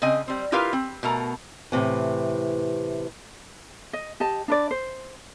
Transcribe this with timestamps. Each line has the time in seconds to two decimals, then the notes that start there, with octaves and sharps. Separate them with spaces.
0.02 C#3 C4 D#5 G#5
0.28 G3 C4
0.52 E4 F4 G4 A#4 B4 F5
0.73 C4
1.03 B2 A3 A#4 A#5
1.72 A2 C3 E3
3.93 D#5
4.20 G4 D#5 A5
4.48 D4 B4 D5
4.71 C5